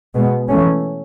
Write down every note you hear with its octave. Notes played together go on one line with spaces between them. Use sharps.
B2 G#3 B3
E3 A3 C#4